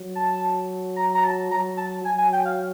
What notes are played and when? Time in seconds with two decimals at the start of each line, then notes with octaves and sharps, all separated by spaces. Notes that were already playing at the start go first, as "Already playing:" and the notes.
Already playing: F#3
0.15 A5
0.96 A#5
1.15 A#5
1.24 A5
1.51 F#3 A#5
1.77 A5
2.04 F#3 G#5
2.18 G#5
2.33 G5
2.45 F5